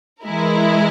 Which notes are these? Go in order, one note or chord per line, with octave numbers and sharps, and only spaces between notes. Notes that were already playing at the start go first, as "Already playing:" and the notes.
E3 G#3 E4 A#4